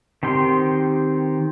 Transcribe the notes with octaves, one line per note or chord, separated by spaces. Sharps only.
D#3 C4 G4 C6